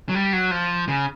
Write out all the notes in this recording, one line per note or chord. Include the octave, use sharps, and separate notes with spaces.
F#3
G3
F#3
F3
C#3